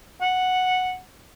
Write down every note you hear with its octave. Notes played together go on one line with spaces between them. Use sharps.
F#5